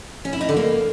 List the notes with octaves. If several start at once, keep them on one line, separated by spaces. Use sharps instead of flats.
C#4
E4
D#4
D3
A#3